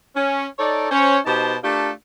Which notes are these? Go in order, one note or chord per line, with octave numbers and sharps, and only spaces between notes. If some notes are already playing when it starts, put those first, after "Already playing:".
C#4
D#4 A4 C#5 D5
C#4 C5 C#5
B2 D#4 G4 C5 A5
A3 D4 F4 G4 A4 A#4